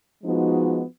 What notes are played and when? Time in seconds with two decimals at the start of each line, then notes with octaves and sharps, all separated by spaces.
0.24 F3 G#3 B3 D#4 F#4